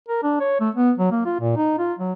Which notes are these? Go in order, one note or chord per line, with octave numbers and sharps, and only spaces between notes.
A#4
D4
C#5
A3
B3
F#3
A#3
F4
A#2
D#4
F4
F#3